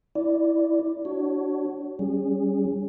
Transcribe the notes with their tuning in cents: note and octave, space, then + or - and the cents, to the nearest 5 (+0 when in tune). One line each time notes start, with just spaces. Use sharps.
E4 +0 D5 +0
D4 +0 F#4 +20 C#5 +10
G3 +0 C#4 +0 G#4 -25